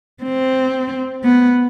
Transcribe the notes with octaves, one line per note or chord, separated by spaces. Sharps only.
C4
B3